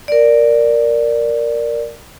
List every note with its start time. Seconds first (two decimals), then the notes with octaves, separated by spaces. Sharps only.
0.08 A#4 D5